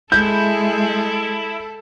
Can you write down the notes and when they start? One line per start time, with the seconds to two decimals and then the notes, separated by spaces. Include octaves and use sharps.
0.12 G#3 E4 A4 G6